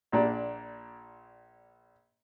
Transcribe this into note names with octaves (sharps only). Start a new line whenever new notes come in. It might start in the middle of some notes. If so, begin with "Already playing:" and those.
A#1 A#2 D4